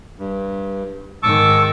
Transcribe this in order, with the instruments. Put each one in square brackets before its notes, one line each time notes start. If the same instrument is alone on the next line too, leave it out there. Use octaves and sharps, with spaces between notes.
[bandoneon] G2
[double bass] G#2 D#3 [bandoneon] A5 C#6 D6 [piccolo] E6